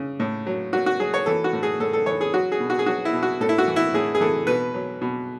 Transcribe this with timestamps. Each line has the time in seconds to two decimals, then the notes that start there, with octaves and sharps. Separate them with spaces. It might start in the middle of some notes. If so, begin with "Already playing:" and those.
Already playing: C#3
0.20 A2
0.46 F#3
0.73 F#3 F#4
0.86 F#4
0.99 F#3 G#4
1.14 C#5
1.26 E3 A4
1.44 F#4
1.53 A2
1.63 G#4
1.80 A2 A4
1.93 A4
2.06 E3 C#5
2.21 G#4
2.34 F#3 F#4
2.52 G#4
2.60 B2
2.70 F#4
2.79 G#4
2.86 F#3 F#4
3.05 E4
3.13 B2
3.23 F#4
3.41 A2 A4
3.49 E4
3.58 F#4
3.67 E3
3.76 E4
3.94 A2 G#4
4.15 G#4
4.20 E3 A4
4.47 B2 B4
4.74 F#3
5.01 B2